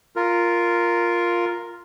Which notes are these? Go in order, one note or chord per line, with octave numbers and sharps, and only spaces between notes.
F4 A#4